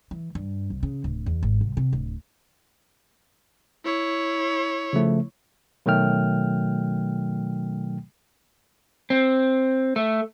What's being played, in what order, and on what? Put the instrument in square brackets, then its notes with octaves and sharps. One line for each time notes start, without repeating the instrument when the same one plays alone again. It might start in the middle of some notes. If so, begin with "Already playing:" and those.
[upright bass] E3
G2
C2
C#3
D1
E2
G#1
C2
C3
D1
[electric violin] E4 C#5
[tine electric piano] C#3 F3 A3
B2 D#3 F#3 A3 G5 F6
[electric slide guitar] C4
A3